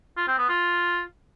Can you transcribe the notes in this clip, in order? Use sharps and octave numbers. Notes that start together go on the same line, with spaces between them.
F4
C4
B3
F4